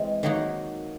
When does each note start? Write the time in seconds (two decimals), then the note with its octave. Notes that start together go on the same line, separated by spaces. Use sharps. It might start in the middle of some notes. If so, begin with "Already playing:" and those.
Already playing: E3 G#3 C4
0.23 D#3 F#3 A#3 D#4 F#4